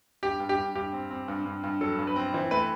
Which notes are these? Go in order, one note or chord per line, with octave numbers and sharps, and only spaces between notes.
G2 G4
G2
G4
G2
G2 G4
C4
C4
G2
G2
G2
F#3 A4
G2
B4
C4
E3 C5
A3 B4